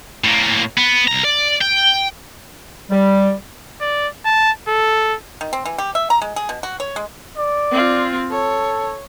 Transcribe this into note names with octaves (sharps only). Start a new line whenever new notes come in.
A2 A#3
B3
C2 A#5
D5
G5
G3
D5
A5
A4
D#3
C4
E3
G4
E5
A#5
G#3
G#4
B2
F#4
C#5
G#3
D5
C4 F4
A4 C#5